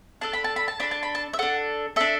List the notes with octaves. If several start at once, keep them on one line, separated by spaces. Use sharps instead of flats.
D4 A4 A5
B5
A5
B5
A5
D4 A4 B5
A5
B5
A5
E5
D4 A4 F#5
D4 A4 E5